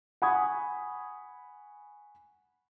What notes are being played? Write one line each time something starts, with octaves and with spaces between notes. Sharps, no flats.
F#5 G#5 B5 C#6 D#6 G#6